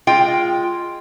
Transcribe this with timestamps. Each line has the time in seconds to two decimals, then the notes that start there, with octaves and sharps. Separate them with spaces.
0.07 G#3 F4 G5